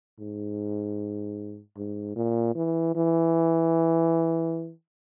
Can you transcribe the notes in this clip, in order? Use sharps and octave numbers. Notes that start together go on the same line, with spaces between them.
G#2
G#2
A#2
E3
E3